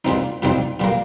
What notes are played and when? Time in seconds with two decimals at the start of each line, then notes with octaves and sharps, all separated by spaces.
0.05 A#2 G3 C4 D#4
0.42 A#2 G3 C4 D#4
0.80 A#2 G3 A#3